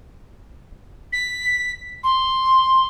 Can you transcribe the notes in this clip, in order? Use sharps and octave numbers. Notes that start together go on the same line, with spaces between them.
B6
C6